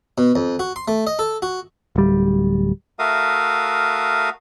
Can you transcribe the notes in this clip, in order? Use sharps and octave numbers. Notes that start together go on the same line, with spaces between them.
B2
F2
F#4
C6
A3
D#5
A4
F#4
D1 G3
A3 F#4 A#4 E5 F5 D#6